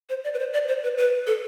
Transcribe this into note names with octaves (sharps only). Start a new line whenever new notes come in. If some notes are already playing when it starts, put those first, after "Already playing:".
C5
D5
B4
C5
D5
C5
B4
B4
A4